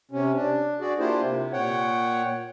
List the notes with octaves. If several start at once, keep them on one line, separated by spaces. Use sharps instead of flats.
C3 C#4
D4
F#4 G#4 D5
A#3 D4 E4 F4 G4 C5
C3
A#2 C#5 F#5 G5